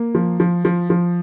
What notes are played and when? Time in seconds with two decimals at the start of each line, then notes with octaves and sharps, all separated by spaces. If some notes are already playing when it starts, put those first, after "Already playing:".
Already playing: A#3
0.15 F3
0.40 F3
0.65 F3
0.90 F3